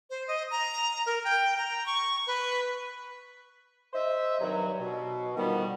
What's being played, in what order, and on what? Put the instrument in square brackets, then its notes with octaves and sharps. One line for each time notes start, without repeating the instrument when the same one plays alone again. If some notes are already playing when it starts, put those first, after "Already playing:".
[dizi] C5
D#5
A#5
A#4
G5
A#5
C#6
B4
[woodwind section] C5 D#5 E5
G2 C3 D#3 F#3
B2
D3 D#3 F3 G3 B3